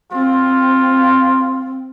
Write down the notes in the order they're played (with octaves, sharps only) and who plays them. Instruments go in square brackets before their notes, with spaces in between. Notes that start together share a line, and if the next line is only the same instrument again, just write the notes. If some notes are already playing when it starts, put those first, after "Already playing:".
[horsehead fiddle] C4 [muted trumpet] F4